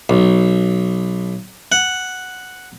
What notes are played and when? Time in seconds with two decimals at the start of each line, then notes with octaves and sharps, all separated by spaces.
0.10 B1
1.72 F#5